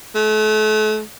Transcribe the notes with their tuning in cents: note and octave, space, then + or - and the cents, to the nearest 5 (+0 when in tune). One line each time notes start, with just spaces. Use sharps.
A3 -35